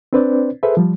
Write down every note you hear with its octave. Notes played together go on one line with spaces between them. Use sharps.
C4 D4 B4 C5 D5
G#4 A4 B4 C5 E5
F3 G3